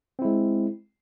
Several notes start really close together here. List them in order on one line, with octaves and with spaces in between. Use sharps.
C4 E4 G#3